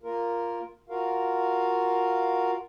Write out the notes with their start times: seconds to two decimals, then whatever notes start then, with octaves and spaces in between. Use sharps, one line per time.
0.03 A#3 F4 A#4
0.89 F4 F#4 A#4 F5